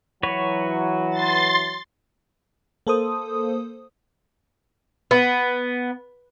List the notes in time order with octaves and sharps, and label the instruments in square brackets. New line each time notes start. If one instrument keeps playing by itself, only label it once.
[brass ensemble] E3 F#3 [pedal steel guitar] F#4 B4 C#5
[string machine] C6 A6
[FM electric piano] A#3 A4 C5 D#6
[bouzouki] B3